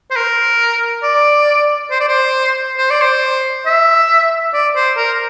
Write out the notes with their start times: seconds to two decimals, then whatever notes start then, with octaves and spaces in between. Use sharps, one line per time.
0.11 C5
0.16 A#4
1.03 D5
1.91 C5
2.00 D5
2.08 C5
2.78 C5
2.90 D5
3.01 C5
3.66 E5
4.53 D5
4.76 C5
4.97 A#4